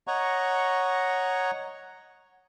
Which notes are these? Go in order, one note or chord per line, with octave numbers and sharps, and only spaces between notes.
C#5 D#5 F#5 A#5 C#6